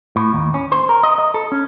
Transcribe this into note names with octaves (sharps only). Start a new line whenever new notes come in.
A2
D#2
C#4
C5
A#4
D#5
D#5
A4
C#4